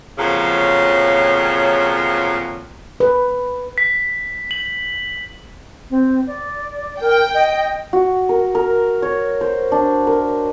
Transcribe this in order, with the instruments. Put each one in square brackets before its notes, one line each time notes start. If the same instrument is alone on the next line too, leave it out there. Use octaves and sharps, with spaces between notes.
[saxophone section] F2 A#2 C#3 F3 F#3
[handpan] B4
[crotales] B6
F#7
[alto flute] C4
D5
[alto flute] A#4 [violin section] G5
[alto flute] D#5
[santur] F#4
A#4
A#4
C#5
C5
D4
A#4